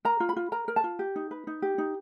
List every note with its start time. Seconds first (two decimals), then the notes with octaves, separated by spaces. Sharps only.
0.05 A#4 A#5
0.20 F4
0.29 B5
0.36 F4
0.52 A#4 A#5
0.68 A#4
0.76 A5
0.84 F4
0.99 G4
1.16 D#4
1.31 B4
1.47 D#4
1.62 G4
1.78 D#4